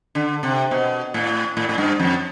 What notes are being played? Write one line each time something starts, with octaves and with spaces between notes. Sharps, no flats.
D3
C3
B2
A2
A2
A2
G2
F2